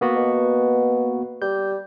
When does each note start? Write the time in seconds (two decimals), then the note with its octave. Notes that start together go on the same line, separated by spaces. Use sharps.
0.01 A#3 B3 F#4
0.16 B2
1.42 G3 G6